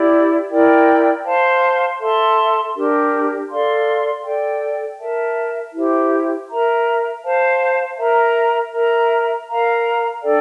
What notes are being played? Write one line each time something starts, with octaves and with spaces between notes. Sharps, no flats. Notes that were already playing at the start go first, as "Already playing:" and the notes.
Already playing: E4 G4 D5
E4 A#4 D5 G5
C5 F5 A5 C6
A4 E5 A5 C6
D4 G4 A#4
A4 D5 F5 C6
A4 D5 G5
A#4 E5 A5
E4 G4 C5
A#4 E5 A#5
C5 F5 A5
A#4 E5 A#5
A#4 E5 A#5
A#4 F5 A#5
D4 A4 D5 G5